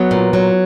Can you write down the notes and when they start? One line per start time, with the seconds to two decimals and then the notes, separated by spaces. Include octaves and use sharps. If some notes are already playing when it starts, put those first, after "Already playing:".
Already playing: F#3 B3
0.11 A#2
0.33 F#3